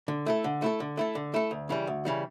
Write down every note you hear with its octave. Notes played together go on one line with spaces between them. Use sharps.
D3
A3 E4 A4
D3
A3 E4 A4
D3
A3 E4 A4
D3
A3 E4 A4
D2
C#3 E3 G3
D2
C#3 E3 G3